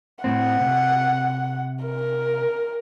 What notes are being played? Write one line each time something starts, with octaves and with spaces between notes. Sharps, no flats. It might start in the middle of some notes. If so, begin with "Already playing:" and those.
A2 C4 F#5
C3
A#4